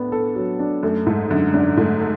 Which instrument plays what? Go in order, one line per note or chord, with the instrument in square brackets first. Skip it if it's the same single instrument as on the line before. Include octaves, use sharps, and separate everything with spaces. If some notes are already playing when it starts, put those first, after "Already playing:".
Already playing: [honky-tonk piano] A2 [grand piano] B3 D4 A4
[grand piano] A4
F#3
D4
[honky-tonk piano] F#2 [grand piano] A3
[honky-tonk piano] G#2 [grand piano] A4
[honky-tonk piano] F#2 [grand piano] D3
[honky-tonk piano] F#2 [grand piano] D4
[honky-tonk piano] G#2 [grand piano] A3
[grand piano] A4